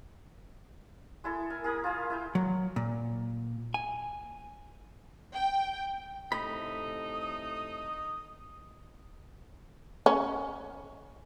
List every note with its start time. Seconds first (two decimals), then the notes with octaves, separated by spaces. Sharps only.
1.24 G#3 E4 A4
1.50 A#4 G#5
1.64 G#4 A#4 B5 D#6
1.84 F4 G#4 F5
2.10 E4 G#4 G5
2.35 F#3
2.76 A#2
3.74 G#5
5.34 G5
6.32 A2 C3 D#4 A4 B5
7.13 D#6
10.06 C#4